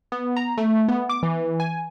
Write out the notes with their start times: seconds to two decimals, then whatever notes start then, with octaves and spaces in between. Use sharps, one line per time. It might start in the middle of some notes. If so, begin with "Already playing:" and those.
0.12 B3
0.36 A#5
0.58 A3
0.88 B3
1.09 D6
1.23 E3
1.60 G#5